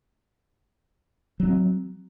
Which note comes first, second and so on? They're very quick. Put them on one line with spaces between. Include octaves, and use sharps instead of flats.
F#3 C#4 C4